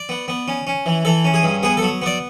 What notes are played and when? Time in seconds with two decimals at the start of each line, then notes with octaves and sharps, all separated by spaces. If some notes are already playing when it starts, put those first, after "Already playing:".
Already playing: D5
0.09 B3
0.28 B3
0.48 C#4
0.67 C#4
0.86 E3
1.05 E3 A4
1.25 C#4
1.34 G#4
1.43 G2
1.63 B3 G#4
1.77 F#3 A4
2.02 B3 D5